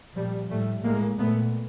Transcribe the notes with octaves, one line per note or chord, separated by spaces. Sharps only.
A#2 F3 G3
A2 G3 A3
A2 G#3 A#3
A#2 A3 B3